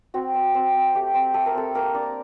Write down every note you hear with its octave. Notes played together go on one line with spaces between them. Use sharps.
C4 F#4
C4
C4
C4
A3 G4
C4
A3 A4
A#4
C4 A4
A#3 A#4
D4 D5